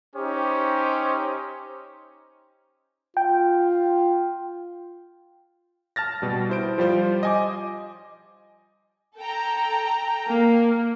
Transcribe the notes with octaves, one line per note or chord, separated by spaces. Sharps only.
C#4 D#4 G4 C5
F4 G5
A5 F6 A6 A#6
B2 G3
E4 C5 D7
F3 G3 F4 C5
D#5 G#5 D6
A4 G5 A#5
A#3